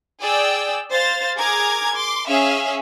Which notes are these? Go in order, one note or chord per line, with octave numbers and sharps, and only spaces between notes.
G#4 D5 G5 E6
C5 F5 A6
G#4 A#4 A#5 D6 G#6
C6 D6
C#4 G#4 E5 F5